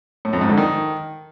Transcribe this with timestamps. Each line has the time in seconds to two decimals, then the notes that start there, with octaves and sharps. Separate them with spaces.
0.25 A2
0.33 F2
0.41 G#2
0.49 D3
0.57 D#3